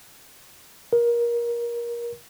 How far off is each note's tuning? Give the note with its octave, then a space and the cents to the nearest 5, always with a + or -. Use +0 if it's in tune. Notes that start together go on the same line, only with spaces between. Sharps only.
A#4 +25